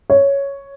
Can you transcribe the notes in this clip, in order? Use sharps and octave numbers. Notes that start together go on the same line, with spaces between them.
C#5